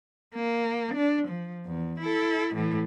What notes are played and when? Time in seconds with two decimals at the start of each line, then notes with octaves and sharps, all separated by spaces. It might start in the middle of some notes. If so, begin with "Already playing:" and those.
0.35 A#3
0.95 D4
1.28 F3
1.66 E2
2.01 E4 A4
2.54 A2 E3